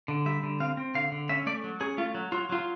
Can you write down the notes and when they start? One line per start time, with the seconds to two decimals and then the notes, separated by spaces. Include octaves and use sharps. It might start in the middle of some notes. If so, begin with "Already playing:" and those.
0.08 D3
0.26 G3 E5
0.43 D3
0.60 C4 F5
0.77 C4
0.95 D3 F5
1.12 D3
1.29 C#4 E5
1.46 A3 D5
1.64 F#3
1.80 C#4 G#4
1.98 A3 F4
2.14 F#3
2.32 F#3 F4
2.49 F#3 F4